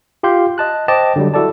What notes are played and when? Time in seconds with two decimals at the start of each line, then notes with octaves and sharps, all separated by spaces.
0.23 F4 G4 F5 C6 G6
0.58 D#5 A5 F#6
0.88 C5 D#5 G5 A5 D6
1.16 D3 F#3 G3
1.34 E4 F#4 A4 D5 A5